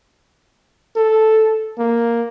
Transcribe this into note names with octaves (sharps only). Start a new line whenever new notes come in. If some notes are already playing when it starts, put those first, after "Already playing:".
A4
A#3